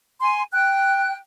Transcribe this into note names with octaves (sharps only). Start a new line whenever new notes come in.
G#5 C6
G5 F#6